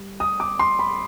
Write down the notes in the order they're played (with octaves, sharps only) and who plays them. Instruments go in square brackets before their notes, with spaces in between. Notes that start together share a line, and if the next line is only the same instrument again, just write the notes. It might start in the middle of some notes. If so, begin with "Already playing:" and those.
Already playing: [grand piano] G3
D#6
D6
C6
B5